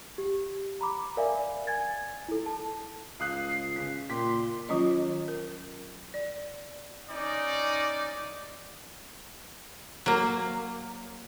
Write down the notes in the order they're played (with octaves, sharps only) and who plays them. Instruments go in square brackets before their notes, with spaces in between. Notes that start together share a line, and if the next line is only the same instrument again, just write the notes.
[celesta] G4
A#5 B5 D6
A#4 D5 E5 F5 G#5
G#5 G#6 A6
E4 A4
A5
[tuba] C#2 [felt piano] F5 D#6 F#6 [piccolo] C7
[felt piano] C#3 B6
[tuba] A#2 [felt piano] G5 D6 B6 [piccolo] C6
[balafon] D#3 F#3 C#4 F4 D#5
A#4
D5
[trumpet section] C#4 D#4 D5
[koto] F#3 A#3